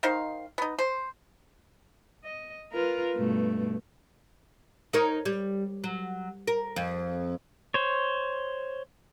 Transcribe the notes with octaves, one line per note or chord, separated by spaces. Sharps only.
D#3 D#4 C5 F5
B3 D#4
C5
D#5
F4 A#4 B4
G2 B2 A3
D#4 A#4 C#5
G3
F#3
A#4
F2
C5 C#5